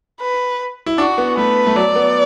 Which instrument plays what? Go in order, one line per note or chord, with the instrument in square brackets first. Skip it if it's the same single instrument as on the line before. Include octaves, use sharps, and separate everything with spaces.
[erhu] B4
[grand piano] E4
[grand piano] D4 [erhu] F#4
[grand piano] B3
[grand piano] A3 [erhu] B4
[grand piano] A3
[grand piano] F#3 [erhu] D5
[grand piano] B3